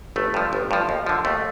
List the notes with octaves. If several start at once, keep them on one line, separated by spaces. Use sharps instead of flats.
G1 A3
G2 F3
G1
G2 F3
D#2
D3 F3
D#2 A3